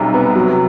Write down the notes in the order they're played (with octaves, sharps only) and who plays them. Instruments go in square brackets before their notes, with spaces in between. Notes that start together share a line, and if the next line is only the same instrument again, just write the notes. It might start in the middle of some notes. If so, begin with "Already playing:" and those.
Already playing: [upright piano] B1 G3 [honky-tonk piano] C3
[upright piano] B3
F#3